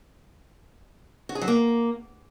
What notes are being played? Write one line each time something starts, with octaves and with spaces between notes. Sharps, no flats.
F#4
G#4
F#3
A#3